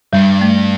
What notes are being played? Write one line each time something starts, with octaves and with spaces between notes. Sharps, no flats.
G2 G3
A3